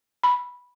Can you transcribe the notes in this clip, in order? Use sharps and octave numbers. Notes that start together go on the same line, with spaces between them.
B5